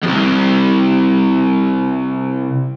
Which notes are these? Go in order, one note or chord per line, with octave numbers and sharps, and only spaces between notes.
C2 F2